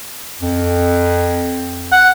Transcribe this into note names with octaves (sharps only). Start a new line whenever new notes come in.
F2
F#5